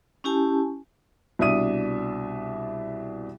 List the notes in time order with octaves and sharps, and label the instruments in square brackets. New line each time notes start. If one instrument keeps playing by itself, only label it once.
[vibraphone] C#4 E4 G4 G#5 A5
[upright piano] C2 B2 D4 E5 D#6 D#7